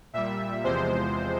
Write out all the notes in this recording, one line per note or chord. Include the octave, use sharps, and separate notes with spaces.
A#2 G3 E5
E2 C3 F3 G#3 C5